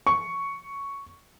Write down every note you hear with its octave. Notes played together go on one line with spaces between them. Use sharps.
C#6